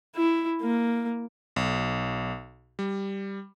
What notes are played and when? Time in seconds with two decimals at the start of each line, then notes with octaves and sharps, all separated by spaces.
0.16 E4
0.61 A#3
1.56 B1
2.79 G3